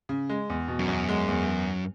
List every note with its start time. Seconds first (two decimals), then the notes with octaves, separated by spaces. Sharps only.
0.09 C#3
0.29 G#3
0.49 E2
0.68 B2
0.79 F#2
0.88 E2
1.09 G#3
1.28 E2